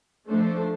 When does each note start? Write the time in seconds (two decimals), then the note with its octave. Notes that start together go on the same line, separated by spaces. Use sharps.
0.29 F3 A3 D4 A4 C5